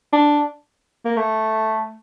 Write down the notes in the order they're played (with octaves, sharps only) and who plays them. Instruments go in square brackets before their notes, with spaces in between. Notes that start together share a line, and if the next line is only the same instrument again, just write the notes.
[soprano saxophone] D4
A#3
A3